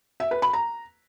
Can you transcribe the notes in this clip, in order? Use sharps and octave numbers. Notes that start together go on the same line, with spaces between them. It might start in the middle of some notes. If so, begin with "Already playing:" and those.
E5
B4
B5
A#5